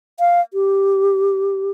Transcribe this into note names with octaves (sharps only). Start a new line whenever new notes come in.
F5
G4